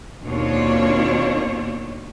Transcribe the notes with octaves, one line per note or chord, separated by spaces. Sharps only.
D#2 B2 C4 D4 F4 C#5